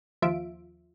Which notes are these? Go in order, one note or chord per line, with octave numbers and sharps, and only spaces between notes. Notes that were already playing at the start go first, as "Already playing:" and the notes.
D#2 F3 F4 E5 D7